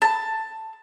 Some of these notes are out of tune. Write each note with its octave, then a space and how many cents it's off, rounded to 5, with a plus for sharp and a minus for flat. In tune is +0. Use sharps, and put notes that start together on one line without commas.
A5 +10